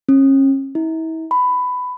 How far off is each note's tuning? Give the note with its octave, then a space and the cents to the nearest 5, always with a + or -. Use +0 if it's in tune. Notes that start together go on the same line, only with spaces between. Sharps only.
C#4 -35
E4 -40
B5 +15